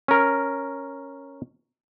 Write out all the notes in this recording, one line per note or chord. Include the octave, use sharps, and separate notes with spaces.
C#4 A#4